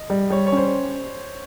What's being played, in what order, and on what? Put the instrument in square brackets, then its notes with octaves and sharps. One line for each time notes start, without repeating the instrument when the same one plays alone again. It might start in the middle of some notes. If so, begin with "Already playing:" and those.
Already playing: [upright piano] D#5
[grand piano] G3
[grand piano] G3 [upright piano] C#5
[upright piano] C#5
[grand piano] C#4 [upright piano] C5